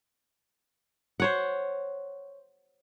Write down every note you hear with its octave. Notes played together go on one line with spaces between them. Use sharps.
C5 C#5 F#5